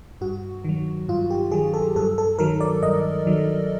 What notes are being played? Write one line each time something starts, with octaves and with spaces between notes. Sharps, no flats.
G2 F#4
D#3 F#3
G2 F4
G4
D#3 F#3 G#4
A4
G2 A4
A4
D#3 F#3 A#4
D5
G2 D#5
D#3 F#3